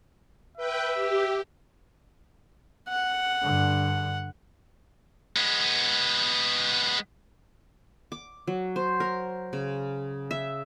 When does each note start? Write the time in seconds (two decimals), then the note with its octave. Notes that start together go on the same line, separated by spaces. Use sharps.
0.57 B4 E5 G5
0.94 G4
2.89 F#5
3.42 G2 D3
5.36 G#3 B3
8.12 D6
8.47 F#3
8.76 C5
9.00 A#4
9.53 C#3
10.31 E5